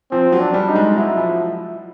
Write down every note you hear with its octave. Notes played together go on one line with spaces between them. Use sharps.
F3 C4
F#3
D4
G3
D#4
G#3
F#3 E4
F3